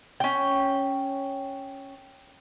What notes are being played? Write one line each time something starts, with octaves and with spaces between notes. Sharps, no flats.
C#4 G5